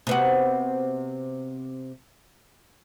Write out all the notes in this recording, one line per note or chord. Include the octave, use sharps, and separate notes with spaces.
C3 B3 F#4